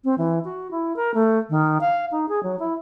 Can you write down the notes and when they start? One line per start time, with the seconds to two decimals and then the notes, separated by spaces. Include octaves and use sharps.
0.04 C4
0.18 E3
0.45 F#4
0.71 E4
0.96 A#4
1.14 A3
1.50 D#3
1.81 F5
2.11 D#4
2.29 G#4
2.43 F#3
2.59 E4